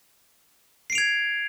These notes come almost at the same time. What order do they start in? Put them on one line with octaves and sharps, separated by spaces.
C7 D7 F7 G#6